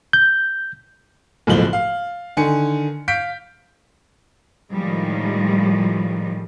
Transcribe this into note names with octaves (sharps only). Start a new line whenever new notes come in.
G6
F#1 B1 A2 F3 F#7 G7
F5
D3 D#3 G#5 C#7
F5 G6 B6 D7
A2 D#3 F3 G3 G#3